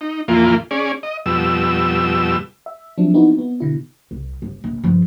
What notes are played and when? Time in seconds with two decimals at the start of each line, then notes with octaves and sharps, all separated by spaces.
0.01 D#4
0.28 F2 A#2 E3 A#3 F4
0.71 C#4 G#4 D5
1.03 D#5
1.26 F2 B2 G3 E6
2.66 E5
2.98 F3 F#3 C4 D4
3.14 B3 C4 D#4 E4 F#4
3.38 B3
3.60 B2 D3 E4
4.11 C2
4.42 G1
4.64 A#1
4.84 G2 F3